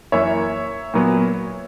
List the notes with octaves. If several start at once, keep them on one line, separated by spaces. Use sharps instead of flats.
F#2 E3 A#3 C#5 E5
A#2 F#3 B3